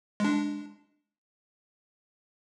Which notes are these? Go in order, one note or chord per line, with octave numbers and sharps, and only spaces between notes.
G#3 D4